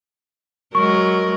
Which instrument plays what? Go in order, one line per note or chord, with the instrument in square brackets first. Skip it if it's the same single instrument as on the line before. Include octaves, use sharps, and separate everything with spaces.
[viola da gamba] F#3 G#3 A#4 [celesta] C#6